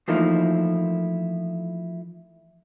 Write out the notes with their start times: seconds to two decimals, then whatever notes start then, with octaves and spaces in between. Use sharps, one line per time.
0.08 E3 F3 A3 A#3 D#4 E4